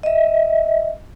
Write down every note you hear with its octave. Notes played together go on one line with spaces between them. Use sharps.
D#5 E5